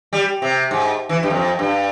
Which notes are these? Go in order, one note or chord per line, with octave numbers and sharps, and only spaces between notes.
G3
C3
G#2
E3
G2
F2
G2